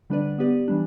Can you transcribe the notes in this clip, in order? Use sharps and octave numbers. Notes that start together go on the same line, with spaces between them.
D3 G3 D4 B4 D5
B3 G4 B4 D5
E3 G3 D4